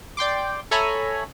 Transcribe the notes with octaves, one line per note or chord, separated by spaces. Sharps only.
D5 G5 C6 D6
A4 C#5 E5 G#5 A#5 B5